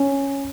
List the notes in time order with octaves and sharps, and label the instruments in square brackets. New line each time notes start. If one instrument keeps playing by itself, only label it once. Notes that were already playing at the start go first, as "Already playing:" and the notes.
Already playing: [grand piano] C#4